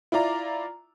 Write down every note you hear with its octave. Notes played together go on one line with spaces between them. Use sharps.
E4 F4 D5 A#5